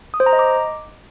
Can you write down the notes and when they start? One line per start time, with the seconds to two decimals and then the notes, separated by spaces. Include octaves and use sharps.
0.14 D#6
0.20 C5
0.26 A#5
0.33 D#5
0.39 D6